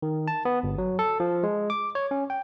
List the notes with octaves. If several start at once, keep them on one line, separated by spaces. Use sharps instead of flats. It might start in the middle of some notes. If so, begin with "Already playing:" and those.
D#3
A5
B3
G1
F#3
A4
F3
G#3
D6
C#5
C#4
G5